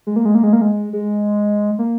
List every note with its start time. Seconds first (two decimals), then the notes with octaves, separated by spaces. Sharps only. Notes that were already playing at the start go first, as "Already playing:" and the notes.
0.07 G#3
0.16 A#3
0.25 G#3
0.35 A#3
0.43 G#3
0.53 A#3
0.61 G#3
0.93 G#3
1.79 A#3